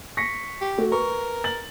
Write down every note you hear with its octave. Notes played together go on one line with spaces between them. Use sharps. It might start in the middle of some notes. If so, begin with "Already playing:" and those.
C#6 A#6 B6 C#7
G4
A3 F#4
A#4 B4 C#6
A6 F#7